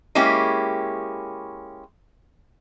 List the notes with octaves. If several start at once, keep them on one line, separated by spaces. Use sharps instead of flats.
G#3 A#3 C#4 E4 G4